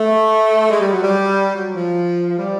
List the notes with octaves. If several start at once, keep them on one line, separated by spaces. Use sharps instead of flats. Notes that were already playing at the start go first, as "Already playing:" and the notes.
Already playing: A3
G#3
G3
F#3
G3
F#3
F3
G3